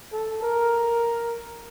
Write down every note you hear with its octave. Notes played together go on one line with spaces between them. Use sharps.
A4
A#4